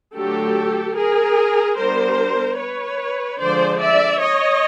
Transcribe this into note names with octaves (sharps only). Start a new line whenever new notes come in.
D3 F#3 A3 G4 A4
G#4 A#4
G3 B3 D4 A#4 C5
B4 C#5
D3 F3 G#3 C5 D5
D5 E5
C#5 D#5